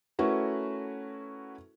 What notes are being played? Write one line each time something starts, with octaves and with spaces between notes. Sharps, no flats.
A3 C#4 E4 F#4 A#4 B4